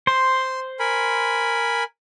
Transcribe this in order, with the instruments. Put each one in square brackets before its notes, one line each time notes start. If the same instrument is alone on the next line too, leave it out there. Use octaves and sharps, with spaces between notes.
[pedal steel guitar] C5 [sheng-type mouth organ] C6
[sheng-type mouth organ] A#4 G#5 B5